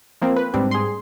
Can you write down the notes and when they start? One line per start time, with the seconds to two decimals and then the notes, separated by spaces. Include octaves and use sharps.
0.22 F3 A#3 C4
0.37 B4
0.54 G#2 G3 C4 D4
0.71 G#4 C6